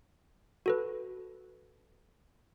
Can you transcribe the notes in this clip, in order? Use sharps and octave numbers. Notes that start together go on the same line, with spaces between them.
F#4 A4 B4